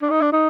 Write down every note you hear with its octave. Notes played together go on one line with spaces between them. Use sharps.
D4
D#4
D4
D#4